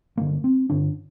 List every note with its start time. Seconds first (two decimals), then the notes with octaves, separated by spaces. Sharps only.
0.17 G2 D3 A#3
0.44 C4
0.70 G2 D3 D4